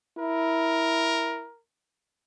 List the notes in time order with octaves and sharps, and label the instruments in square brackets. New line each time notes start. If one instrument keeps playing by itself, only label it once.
[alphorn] E4 [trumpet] A#4